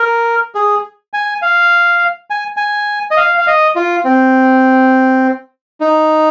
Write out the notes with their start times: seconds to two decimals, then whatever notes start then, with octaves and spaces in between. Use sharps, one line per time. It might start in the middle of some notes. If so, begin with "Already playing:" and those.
Already playing: A#4
0.55 G#4
1.14 G#5
1.42 F5
2.30 G#5
2.57 G#5
3.11 D#5
3.17 F5
3.38 F5
3.47 D#5
3.76 F4
4.05 C4
5.81 D#4